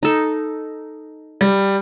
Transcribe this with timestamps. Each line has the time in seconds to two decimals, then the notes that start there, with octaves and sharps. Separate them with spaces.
0.03 D#4 A4
1.41 G3